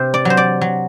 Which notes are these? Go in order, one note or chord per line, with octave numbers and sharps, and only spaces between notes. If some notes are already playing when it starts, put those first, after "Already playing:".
Already playing: C3 C5
D5
F#3 C5
D5
F#3